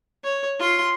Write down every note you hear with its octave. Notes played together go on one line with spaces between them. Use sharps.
C#5
F4 C6